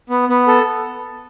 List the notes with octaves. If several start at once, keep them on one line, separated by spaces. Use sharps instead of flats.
B3
B3
A4